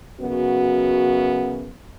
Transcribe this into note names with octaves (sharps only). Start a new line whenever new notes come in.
F#2 C#3 B3 F#4